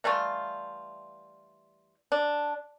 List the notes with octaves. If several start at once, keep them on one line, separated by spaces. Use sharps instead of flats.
E3 G3 A3 F4
D4